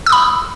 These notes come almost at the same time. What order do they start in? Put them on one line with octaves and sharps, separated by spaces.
E6 D#6 B5